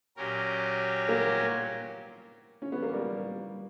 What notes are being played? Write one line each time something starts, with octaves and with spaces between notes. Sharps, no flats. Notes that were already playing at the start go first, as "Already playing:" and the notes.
A#2 F#3 C#4 G4 A#4
A#3
C#4
B3
A#3
G3